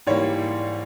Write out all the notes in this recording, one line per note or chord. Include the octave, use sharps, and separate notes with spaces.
G#2 E3 G3 A#3 C#5